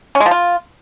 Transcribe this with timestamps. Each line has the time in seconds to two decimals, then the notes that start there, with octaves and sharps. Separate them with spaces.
0.15 C#4
0.20 G#3
0.26 F3
0.31 F4